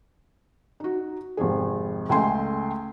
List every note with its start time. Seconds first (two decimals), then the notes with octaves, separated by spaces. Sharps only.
0.80 D#4 F#4
1.37 G#1 F2 C3 G#4
2.09 C#2 A3 G5 G#5 C6